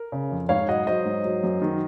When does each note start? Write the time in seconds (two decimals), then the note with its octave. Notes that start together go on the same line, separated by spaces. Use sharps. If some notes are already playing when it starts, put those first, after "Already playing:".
Already playing: A#4
0.12 C#3
0.31 F2
0.49 G#2 C#5 F5
0.68 F#3 D#5 F#5
0.87 F#3 C5 D#5
1.05 G#2
1.25 F#3
1.43 F#2
1.62 D#3